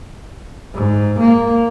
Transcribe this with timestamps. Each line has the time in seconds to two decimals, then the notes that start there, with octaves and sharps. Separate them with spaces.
0.74 G#2
1.19 A#3